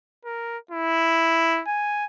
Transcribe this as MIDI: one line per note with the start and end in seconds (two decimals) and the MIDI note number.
0.25 0.58 70
0.71 1.62 64
1.68 2.05 80